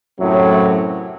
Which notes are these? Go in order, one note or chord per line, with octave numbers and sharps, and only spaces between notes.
F#2 A2 C3 F#3